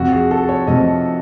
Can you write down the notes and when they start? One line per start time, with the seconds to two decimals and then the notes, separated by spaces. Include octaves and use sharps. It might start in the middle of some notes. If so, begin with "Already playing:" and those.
Already playing: F2 C3 F3 F#4
0.12 G#4
0.31 A4
0.49 C#5
0.67 F2 C3 F3 D#5